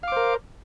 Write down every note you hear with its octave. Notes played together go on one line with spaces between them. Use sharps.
A#4 C5 F5 D6